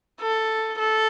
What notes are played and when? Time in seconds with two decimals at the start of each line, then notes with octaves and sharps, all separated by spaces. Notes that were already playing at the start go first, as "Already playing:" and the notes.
0.21 A4
0.79 A4